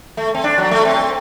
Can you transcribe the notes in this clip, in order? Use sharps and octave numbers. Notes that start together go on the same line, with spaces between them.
A3
C4
D4
F#3
A3
C4